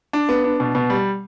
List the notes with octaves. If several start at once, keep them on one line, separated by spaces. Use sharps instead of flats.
D4
B3
D4
B2
B2
G3